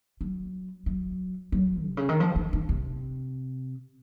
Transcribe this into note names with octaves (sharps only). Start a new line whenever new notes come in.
F#3
F#3
F#3
C3
C#3
D#3
F3
D#3
D#3
C3